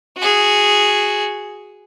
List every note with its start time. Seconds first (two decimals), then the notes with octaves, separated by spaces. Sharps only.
0.17 F#4 G#4